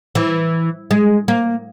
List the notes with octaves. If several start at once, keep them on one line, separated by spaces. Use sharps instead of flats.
E3
G#3
A#3